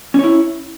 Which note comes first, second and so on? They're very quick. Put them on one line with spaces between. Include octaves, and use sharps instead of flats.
C#4 C#5 E4